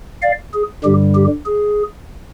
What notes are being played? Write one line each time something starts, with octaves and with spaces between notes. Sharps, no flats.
D5 F5
G#4
G2 D3 G3 G4
G4
G#4